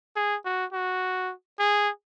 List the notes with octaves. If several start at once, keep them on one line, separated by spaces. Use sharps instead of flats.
G#4
F#4
F#4
G#4